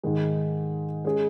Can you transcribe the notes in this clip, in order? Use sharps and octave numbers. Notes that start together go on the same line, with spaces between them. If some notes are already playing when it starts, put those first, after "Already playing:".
G#2 D#3 G#3
G#3 C#4 G#4